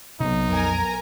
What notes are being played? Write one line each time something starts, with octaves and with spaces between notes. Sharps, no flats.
B1 C3 B3 D#4
F2 A#4 G#5 A#5